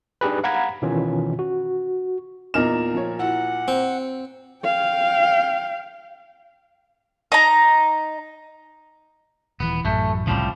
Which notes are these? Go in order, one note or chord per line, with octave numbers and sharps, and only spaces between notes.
D4 D#4 G4 G#4 B4
F5 F#5 A#5 B5 G#6 B6
B2 D#3 E3 C#4 F4
F#4
E2 A#2 D#4 A#4 F6 E7
F3 C#5
E4 F#4 F#5
C4
F5 G5
D#4 A#5
D#1 E3 B3
A1 F#2 A3
C2 A2 C#3 F3 G3